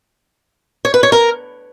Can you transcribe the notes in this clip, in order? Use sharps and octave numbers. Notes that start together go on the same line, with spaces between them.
C#5
B4
C#5
A#4